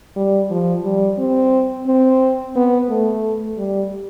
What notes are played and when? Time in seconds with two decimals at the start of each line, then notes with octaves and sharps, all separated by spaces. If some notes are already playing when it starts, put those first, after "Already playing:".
0.16 G3
0.50 F3
0.84 G3
1.18 C4
1.87 C4
2.56 B3
2.90 A3
3.58 G3